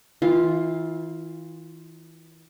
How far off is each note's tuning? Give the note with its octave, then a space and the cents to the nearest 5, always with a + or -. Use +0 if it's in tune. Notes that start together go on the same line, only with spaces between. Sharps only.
E3 -30 F4 +0